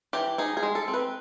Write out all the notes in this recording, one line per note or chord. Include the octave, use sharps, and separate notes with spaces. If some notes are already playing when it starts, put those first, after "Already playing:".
E3 G4
D#4 G#4
G#4
G#3
A4
C4
B4